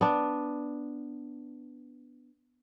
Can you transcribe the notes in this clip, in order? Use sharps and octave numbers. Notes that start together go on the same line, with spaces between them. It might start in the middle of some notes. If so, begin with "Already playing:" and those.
B3 D4